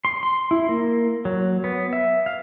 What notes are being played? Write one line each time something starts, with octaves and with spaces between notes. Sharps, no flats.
C6
C6
E4
A#3
F#3
B3
E5
F5